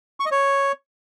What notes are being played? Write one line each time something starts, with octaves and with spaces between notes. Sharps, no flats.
C#6
D#5
C#5